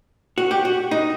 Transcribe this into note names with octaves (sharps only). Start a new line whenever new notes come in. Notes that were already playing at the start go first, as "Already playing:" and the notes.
F#4
G4
F#4
D#4